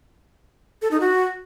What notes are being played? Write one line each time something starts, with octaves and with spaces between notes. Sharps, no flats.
A4
D#4
F#4